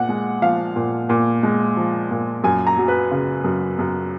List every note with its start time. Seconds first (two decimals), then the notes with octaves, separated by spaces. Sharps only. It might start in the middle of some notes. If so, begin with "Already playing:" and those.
Already playing: A#2 F#5
0.09 G#3
0.42 F3 F5
0.76 A#2
1.09 A#2
1.43 G#3
1.77 F3
2.11 A#2
2.44 F#2 G#5
2.67 A#5
2.77 F#3
2.88 B4
3.11 C#3
3.44 F#2
3.79 F#2